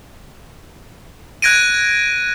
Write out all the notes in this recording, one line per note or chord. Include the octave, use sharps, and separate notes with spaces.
F#6 G#6 A#6 D7 D#7